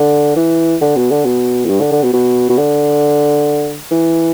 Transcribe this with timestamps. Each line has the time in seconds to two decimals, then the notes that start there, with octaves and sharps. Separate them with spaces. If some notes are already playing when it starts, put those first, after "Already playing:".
Already playing: D3
0.36 E3
0.81 D3
0.96 B2
1.11 D3
1.25 B2
1.65 E2
1.69 G2
1.81 D3
1.92 D3
2.03 B2
2.13 B2
2.49 B2
2.58 D3
3.91 E3